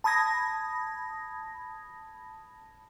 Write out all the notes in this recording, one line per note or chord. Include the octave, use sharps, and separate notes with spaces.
A5 B5 D#6 G#6 A#6